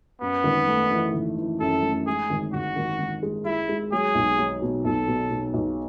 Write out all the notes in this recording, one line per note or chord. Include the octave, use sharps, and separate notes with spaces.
F#2 B3
G#1
A3
E3
G#1
E3
F#2 A4
A3
G#3 G#4
G#1
G#1 F#4
G#1
G#1
G#3
G#3 E4
G#3
F#3 G#4
B1
F#3
B2
B1 A4
B2
B2
B1